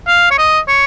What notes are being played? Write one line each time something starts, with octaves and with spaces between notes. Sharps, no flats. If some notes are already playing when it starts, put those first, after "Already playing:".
F5
C#5
D#5
C#5